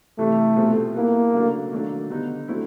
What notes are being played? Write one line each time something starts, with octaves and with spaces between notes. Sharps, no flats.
C3 E3 G3 A3
B2 G3 C4 F4 G#4
G3 A#3 B3 E4 G4
C#3 F#3 A3 D4
D#3 F#3 A3 D4
D3 G3 B3 D#4
D3 F#3 A3 C4 E4